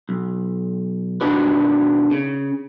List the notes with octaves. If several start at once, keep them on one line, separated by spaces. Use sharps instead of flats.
B1
B2 D3 D#3 D4 F#4 B4
C#3